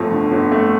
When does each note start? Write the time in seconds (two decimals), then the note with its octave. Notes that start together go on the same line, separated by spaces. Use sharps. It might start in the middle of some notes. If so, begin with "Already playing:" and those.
Already playing: G1 F2 A3
0.12 D3
0.32 G1
0.52 A3